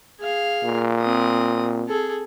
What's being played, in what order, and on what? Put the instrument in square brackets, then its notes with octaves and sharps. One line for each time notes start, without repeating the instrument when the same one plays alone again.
[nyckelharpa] G#4 F5
[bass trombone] A#2
[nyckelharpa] C4 D#6
G#4 A4